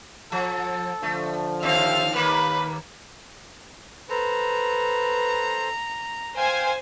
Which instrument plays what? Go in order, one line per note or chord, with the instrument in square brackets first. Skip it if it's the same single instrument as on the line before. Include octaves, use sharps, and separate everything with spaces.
[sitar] F3 [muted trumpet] A4
[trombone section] D3 F3 [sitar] A3
[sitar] D#2 C4 [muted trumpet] E5 [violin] F5 F6
[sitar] D#2 A#3 [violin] B4 [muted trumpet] B5
[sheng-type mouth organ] A4 C5 [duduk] B4 [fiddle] A#5
[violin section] C5 G#5 [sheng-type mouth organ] F5 G5 C6